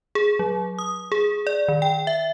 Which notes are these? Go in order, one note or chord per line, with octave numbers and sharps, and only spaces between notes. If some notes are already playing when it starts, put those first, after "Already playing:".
G#4
F#3
D#6
G#4
D5
D#3
G5
E5